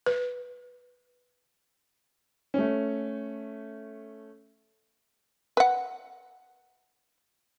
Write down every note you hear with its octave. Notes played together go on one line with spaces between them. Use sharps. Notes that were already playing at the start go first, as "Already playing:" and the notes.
B4
A3 C#4
B4 F#5